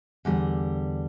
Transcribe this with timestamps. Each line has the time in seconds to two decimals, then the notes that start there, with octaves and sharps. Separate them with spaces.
0.25 E2 D3 G3